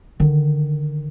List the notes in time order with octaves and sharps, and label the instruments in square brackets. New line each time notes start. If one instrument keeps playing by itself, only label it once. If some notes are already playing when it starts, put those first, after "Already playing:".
[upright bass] D3 D#3